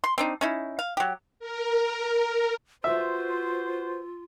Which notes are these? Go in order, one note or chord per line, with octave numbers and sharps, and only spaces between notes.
C6
C4 D4 D#4
C#4 D#4 E4
F5
F#3 G4
A#4
F4 F#4 B4 C5 E5